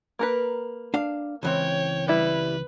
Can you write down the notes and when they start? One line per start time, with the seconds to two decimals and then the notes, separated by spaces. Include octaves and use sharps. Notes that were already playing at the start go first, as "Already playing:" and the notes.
0.19 A#3 A#4 B4
0.94 D4 F5
1.43 C#2 E3 C4 C#5 G5
2.08 G3 E4 B4